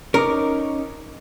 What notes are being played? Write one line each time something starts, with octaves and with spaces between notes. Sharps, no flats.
C#4 D#4 A#4 D6